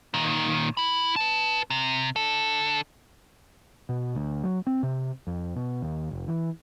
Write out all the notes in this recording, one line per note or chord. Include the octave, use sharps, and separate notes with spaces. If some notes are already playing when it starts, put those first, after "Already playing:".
A#2 D#3
E4 B5
B4 A5
C3
D3 A4
B2
D2
F#3
C4
C3
F2
B2
D#2
F1
E3